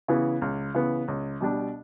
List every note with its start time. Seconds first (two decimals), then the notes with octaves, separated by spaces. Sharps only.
0.08 C#3 E3 B3
0.42 C#2
0.75 C#3 E3 B3
1.08 C#2
1.41 B2 G3 D4